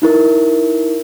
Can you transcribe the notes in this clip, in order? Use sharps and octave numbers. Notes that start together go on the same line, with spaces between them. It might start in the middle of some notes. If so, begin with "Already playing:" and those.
D#4 E4 A#4